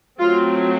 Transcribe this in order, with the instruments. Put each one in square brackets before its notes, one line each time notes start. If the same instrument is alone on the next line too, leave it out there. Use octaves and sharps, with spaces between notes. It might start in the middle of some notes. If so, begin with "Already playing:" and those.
[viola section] F#3 A3 C4 F4